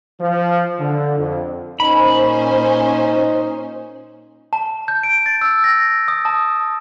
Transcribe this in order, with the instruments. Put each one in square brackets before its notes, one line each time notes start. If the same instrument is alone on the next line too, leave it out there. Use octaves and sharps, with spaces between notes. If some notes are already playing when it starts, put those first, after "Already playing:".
[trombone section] F3
D3
F2
[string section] A#2 C#4 C5 [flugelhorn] D#4 [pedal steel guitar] B5
[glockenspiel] A5
G6
D7
A6
E6
A#6
D#6
A5